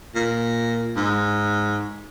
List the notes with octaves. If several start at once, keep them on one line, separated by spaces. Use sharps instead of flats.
A#2
G#2